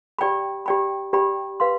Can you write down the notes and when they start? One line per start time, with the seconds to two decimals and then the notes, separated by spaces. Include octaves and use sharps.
0.19 G4 D5 G5 B5
0.66 G4 D5 G5 B5
1.13 G4 D5 G5 B5
1.60 B4 F5 C6